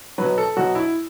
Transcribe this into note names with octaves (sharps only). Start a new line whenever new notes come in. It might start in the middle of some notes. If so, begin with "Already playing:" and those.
B2 F#3 B4
A4
B2 F#3 F#4
E4